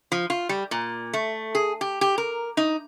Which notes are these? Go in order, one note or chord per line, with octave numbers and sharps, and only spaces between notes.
F3
F4
G3
A#2
A3
G#4
G4
G4
A#4
D#4